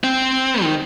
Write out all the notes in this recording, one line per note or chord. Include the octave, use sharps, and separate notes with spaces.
C4
D#3